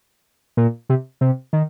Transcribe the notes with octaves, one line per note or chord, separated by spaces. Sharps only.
A#2
C3
C3
D#3